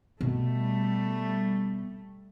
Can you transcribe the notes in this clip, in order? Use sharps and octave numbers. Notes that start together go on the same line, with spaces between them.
B2 G3 A3